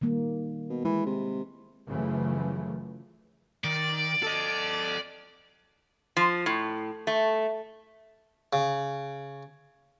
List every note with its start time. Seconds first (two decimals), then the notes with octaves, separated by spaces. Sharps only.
0.01 D#3 G3 A#3
0.70 B2
0.85 E3 G#3
1.06 C3
1.88 F#2 C#3 E3 F3 A3
3.64 D#3 D5
4.23 A4 D#5
6.17 F3
6.46 A2
7.07 A3
8.53 C#3